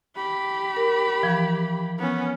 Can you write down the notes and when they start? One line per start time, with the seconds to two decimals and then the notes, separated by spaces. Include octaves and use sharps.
0.16 G4 B5
0.76 A#4
1.23 E3 F3
1.98 B3 C#4